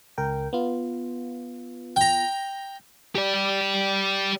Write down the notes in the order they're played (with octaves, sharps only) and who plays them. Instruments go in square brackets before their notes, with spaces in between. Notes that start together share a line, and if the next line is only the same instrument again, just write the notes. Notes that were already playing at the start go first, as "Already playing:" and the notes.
[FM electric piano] C#2 A#4 G5
B3 F4
[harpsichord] G5 A#5
[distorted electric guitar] G4 D5